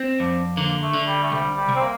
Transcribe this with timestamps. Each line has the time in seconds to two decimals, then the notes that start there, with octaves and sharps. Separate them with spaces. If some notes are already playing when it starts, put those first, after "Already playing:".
Already playing: C4
0.20 F2 D4
0.57 D3 A#3
0.82 A3
0.94 D3
1.07 G3
1.22 A3
1.32 C2 G3
1.56 G3
1.69 C2
1.75 C4
1.82 A#3